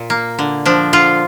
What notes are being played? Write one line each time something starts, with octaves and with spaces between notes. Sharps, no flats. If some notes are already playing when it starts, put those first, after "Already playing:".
Already playing: A#2
A#3
D3
F3 D4
D3 F4